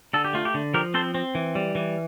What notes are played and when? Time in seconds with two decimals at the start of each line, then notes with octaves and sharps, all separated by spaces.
0.13 D3 A4
0.24 G4
0.33 A3 F4
0.45 G4
0.54 D3
0.74 F3 G4 A#4
0.94 C4 A4 C5
1.14 C4
1.35 E3
1.55 G3
1.75 E3